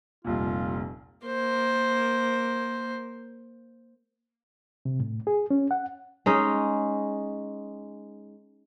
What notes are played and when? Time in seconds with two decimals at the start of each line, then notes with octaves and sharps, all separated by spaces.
0.25 F1 C2 A#2 F4
1.26 A#3 C5
4.85 C3
5.00 A2
5.27 G#4
5.50 C#4
5.71 F#5
6.26 G#3 C#4 D#4